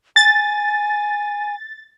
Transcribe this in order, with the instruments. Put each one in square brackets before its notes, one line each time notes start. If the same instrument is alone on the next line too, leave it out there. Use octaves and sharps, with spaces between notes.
[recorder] G#5 [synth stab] A6